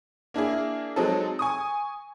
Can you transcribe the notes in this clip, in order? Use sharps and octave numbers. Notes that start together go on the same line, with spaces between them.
A#3 D4 E4 G#4
F#3 G#3 C4 D#4 A4
G#5 C#6 D#6